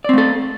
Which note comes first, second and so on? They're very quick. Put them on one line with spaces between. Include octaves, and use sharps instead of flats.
D5 C4 A3 A4